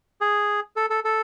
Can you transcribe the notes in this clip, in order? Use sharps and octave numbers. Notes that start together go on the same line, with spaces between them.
G#4
A4
A4
A4